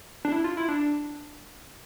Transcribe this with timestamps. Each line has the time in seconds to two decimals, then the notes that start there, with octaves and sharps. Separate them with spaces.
0.25 D4
0.32 E4
0.44 F4
0.57 E4
0.68 D4